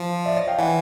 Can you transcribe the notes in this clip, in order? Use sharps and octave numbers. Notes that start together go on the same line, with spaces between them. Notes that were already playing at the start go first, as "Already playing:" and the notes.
Already playing: F3
D5 E5
C#5 D#5
F5 G5
E3 F#5 G#5